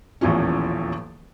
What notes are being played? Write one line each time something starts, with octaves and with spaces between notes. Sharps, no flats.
D#1 A1 E2 E3 F3 C#4